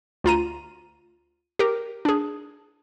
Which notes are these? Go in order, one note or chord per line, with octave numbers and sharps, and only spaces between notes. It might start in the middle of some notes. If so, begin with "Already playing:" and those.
D2 F4 A#5 D#7
G4 A#4
D4 G#4